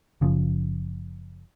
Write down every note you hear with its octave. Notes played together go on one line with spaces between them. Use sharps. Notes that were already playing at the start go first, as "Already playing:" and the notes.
F#1 C#3 F3